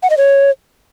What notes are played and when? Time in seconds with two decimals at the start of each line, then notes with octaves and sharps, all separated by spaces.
0.03 F#5
0.10 D#5
0.17 C#5